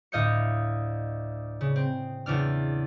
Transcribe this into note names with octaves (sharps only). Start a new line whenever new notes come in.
D2 A2 D#5 F5 G6 C#7
C#3
C4
E2 C#3 D4 F6